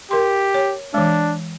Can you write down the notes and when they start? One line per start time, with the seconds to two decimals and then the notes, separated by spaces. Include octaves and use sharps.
0.11 G4 A#4 C6
0.54 C#5
0.94 E3 G#3 D4